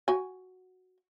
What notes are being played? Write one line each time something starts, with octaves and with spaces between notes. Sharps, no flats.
F#4 G#5